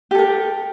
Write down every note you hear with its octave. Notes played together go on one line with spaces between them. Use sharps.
G4 A4 A#4